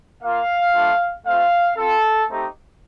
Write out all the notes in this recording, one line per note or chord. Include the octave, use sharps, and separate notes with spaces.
A#3 F4 F5
A3 D4 F4
A3 C4 F4 F5
C4 F4 A4
A3 C4 D#4 G4